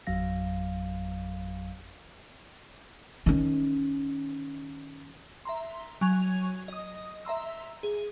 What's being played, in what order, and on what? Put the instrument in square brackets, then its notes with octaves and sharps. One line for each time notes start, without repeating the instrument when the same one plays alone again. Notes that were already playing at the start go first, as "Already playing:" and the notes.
[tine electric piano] G#1 F2 F#3 F5 A#6
[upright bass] D#3 C#4
[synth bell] E5 A#5 C6
F#3 G#5 C#6 G#6 F7
D#5 D#6
E5 A#5 C6 E6
G#4